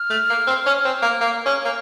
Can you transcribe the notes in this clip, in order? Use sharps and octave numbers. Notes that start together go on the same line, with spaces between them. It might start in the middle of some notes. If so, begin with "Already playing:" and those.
Already playing: F6
A3
A#3
C4
C#4
C4
A#3
A#3
C#4
A#3